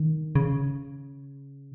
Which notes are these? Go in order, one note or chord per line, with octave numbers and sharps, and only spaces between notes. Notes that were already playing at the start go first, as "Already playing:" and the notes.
Already playing: D#3
C#3